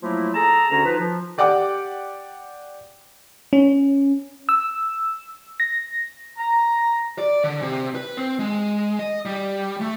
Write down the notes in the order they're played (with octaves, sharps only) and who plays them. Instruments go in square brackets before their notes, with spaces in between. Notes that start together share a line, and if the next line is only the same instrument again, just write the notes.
[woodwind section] F3 F#3 A3 A#3 E4
G#4 A4 A5 A#5
D2 D3 C#4 F#4 A#5
F3 D#4 F4 B4
F3
[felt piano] G4 D5 F#5 G5 D6
[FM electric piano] C#4
E6
A#6
[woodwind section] A#5
[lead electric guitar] D5
D3
C3
B4
C4
G#3
D#5
G3
A3